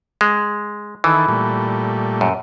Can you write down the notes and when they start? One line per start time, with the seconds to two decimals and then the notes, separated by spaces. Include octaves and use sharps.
0.21 G#3
1.04 D#3 E3 E4 A4
1.28 A#2 G3 A3
2.21 F#2